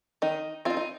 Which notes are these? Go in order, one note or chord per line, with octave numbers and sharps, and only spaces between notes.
D#3 D#4
C4 D#4 F4
D#4